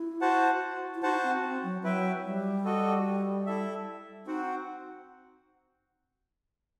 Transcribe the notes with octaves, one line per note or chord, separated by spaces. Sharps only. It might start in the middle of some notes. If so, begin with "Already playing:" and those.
Already playing: E4
F#4 C5 F#5 A5
E4
D#4 F#4 C5 F#5 A5
C4
C4
F#3
F#3 E4 B4 E5 G5
G3
F#4 A4 D#5
E4 A4 E5
C4 D#4 F#4 C5 F#5